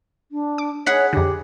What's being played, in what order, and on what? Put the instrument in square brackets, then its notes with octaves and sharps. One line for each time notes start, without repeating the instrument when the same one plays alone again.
[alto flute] D4
[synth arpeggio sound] D6
[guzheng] G#4 F#5 B5 [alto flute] C#5
[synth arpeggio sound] F2 D3 [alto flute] G4